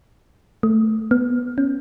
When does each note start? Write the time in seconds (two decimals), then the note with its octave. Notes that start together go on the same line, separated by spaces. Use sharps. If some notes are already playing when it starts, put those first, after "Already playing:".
0.63 A3
1.11 B3
1.58 C#4